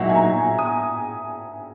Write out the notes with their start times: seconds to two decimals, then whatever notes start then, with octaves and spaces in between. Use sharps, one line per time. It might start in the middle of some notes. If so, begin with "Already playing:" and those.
Already playing: A#2 F#3 A#3 D#4 E5 F#5
0.09 G#5
0.15 A#5
0.59 D#6